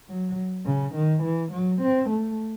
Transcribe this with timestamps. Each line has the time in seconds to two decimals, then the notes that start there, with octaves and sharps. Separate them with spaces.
0.08 F#3
0.66 C#3
0.95 D#3
1.23 E3
1.53 F#3
1.82 C4
2.10 A3